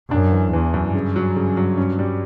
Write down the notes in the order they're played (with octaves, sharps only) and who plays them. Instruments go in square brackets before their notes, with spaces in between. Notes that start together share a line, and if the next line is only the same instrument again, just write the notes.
[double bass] F#2 [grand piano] D4
[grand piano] E3
[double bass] E2 [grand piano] E3
[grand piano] F#2
[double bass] G2 [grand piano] C#3
[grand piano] F#3
C#3
F#3
C#4
G3